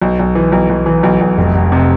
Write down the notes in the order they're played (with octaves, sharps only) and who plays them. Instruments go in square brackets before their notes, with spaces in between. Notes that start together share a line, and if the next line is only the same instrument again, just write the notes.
[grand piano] B1
B1
E3
B1
B1
E3
B1
B1
F1
F1
C3